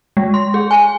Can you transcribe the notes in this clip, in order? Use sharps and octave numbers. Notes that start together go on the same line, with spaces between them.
G#3
C6
G#4
G#5